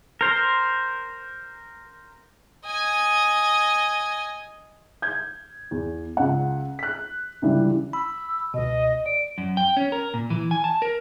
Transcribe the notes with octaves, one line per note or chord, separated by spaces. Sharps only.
A#4 C5
D#5 G#5
G6 G#6
E2
C#2 F#5
F#6 B6
C#2 D3 E3 G3
B5 E6
C#2 B2 D#5
D5 D7
F#2
G5
C#4
A#4
A#2
E3
G#5
A5
A#4